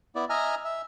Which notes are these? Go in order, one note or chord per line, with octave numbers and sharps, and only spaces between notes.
B3 E4 D5
D#5 E5 G#5 A#5 F6
E5